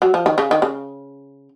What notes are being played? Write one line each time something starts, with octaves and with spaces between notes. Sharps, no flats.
F#3
F3
D#3
C#3
D#3
C#3